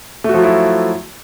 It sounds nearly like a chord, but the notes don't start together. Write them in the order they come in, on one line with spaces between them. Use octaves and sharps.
A3 F#4 F3 F#3 E4